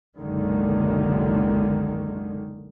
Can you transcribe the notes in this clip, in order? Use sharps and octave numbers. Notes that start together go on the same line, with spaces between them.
F#1 B1 D3 D#3 G#3